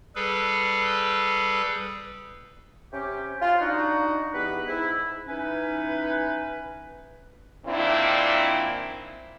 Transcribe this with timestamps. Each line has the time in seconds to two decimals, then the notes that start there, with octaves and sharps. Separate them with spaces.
0.15 G3 G#4 A4 B4
2.93 C3 C#4 G4
3.42 F4
3.61 D4 D#4 F#4
4.34 E2 G3 B3 B4
4.68 G#2 E4
5.27 E3 C#4 D#4 B4
7.66 A#2 D#3 C4 D4 E4